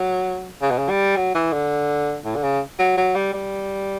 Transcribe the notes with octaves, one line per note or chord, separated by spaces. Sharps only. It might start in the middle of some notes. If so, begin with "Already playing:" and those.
Already playing: F#3
C#3
B2
C#3
G3
F#3
E3
D3
A2
D3
C#3
F#3
F#3
G3
G3